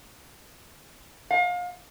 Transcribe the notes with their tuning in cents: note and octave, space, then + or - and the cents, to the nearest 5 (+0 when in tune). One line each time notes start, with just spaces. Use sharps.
F5 +35